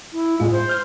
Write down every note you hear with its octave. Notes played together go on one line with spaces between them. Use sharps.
E4
A2 G#3 F4
C5
F6 G6